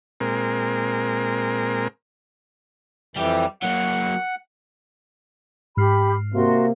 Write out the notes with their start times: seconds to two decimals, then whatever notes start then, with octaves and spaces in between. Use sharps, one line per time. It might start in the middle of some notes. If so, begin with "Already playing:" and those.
0.20 A#2 G#3 C4 A#4
3.16 F2 E3 G3 G4
3.62 F#3 A#3 F#5
5.77 G#2 G4 B5 F6 C7
6.33 C3 A#3 F#4 C6